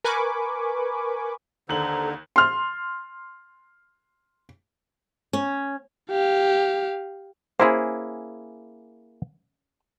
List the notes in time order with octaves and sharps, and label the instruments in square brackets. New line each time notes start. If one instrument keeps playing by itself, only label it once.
[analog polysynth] A#4 B4 G#5 B5 C#6 D6
[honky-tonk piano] D#2 F#7 [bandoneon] D3 [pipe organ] A4 C5 A#5
[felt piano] C6 F6
[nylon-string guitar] C#4
[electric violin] G4 F5
[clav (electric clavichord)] A#3 E4 G#4 [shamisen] C#4 C5